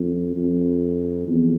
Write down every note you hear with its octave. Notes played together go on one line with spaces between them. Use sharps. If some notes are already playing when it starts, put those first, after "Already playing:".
Already playing: F2
F2
E2